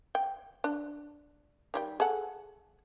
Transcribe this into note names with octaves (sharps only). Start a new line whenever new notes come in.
G5
D4
D#3 G3 G5
G#4 A4 F#5